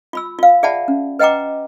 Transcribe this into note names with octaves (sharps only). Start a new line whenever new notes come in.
F4 B5 E6
F4 F5
G#4 D5 E5 F#5 A5 B5
C#4
B4 D#5 F#5 G5 A#5 D6